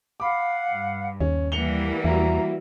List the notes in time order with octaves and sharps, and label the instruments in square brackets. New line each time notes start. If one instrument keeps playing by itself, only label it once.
[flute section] F5 F#5 [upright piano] B5 D6
[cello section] G2
[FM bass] D#2 [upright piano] C#4
[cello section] E3 G3 A#3 [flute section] F#5 [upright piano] C#7 F7 G7
[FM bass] E2 [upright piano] E4 F#4 [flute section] A#5